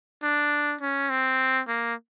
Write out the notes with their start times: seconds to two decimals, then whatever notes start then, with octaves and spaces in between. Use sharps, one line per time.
0.23 D4
0.81 C#4
1.10 C4
1.68 A#3